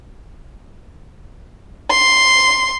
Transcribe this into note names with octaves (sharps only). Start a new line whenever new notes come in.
C6